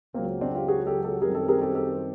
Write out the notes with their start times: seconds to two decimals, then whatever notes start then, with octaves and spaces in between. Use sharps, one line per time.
0.14 C#2 C#3 F#3 A#3 C4
0.41 C4 D4
0.55 F4 G4
0.68 F#4 G#4
0.86 G4 A4
1.03 G4 A4
1.22 F#2 D#3 G3 C4 G#4 A#4
1.35 G4 A4
1.48 G#4 A#4
1.62 G4 A4
1.75 G4 A4